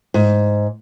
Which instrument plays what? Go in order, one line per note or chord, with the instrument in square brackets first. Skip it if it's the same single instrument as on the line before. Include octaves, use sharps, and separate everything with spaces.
[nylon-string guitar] G#2